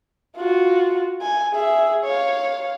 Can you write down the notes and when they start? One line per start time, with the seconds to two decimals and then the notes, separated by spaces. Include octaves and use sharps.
0.37 F4 F#4
1.22 G#5
1.54 G#4 E5
2.04 C#5 F5